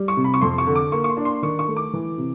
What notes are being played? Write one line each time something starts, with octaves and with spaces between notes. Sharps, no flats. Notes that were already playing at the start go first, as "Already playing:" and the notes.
Already playing: G3
C#6
C3
B5
C#6
F2 C6
C#6
D3
D6
A#3 C#6
C#6
C6
D4
C6
D#3 C#6
C#6
A3
D6
E3
C3